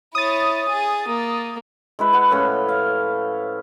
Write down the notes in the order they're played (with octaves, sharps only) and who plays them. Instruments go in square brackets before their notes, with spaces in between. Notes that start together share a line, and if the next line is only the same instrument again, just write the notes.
[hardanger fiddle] E4 C#5 [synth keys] D#6 A6
[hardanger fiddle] G#4
A#3
[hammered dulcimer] G#3 E4 B4
B4 F#5
A2 F3 C#4 B4
F5